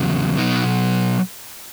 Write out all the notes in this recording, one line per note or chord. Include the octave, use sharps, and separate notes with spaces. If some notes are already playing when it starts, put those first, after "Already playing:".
Already playing: E2 C#3 F#3
B2 F#3 B3 D#4